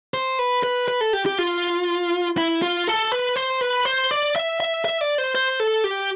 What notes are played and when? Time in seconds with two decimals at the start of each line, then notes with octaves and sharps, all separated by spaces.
0.14 C5
0.39 B4
0.63 B4
0.88 B4
1.01 A4
1.13 G4
1.26 G4
1.39 F4
2.38 E4
2.62 F4
2.87 A4
3.12 B4
3.36 C5
3.61 B4
3.85 C5
4.11 D5
4.36 E5
4.60 E5
4.85 E5
5.01 D5
5.18 C5
5.35 C5
5.60 A4
5.84 G4